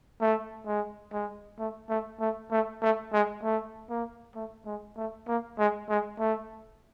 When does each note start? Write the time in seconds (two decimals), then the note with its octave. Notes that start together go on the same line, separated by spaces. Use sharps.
0.21 A3
0.67 G#3
1.13 G#3
1.59 A3
1.90 A3
2.20 A3
2.51 A3
2.82 A3
3.13 G#3
3.43 A3
3.90 A#3
4.35 A3
4.66 G#3
4.97 A3
5.28 A#3
5.58 G#3
5.89 G#3
6.20 A3